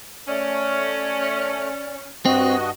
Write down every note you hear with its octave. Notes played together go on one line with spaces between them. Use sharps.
A3 C#4 D5
G2 C4 F#4 D#5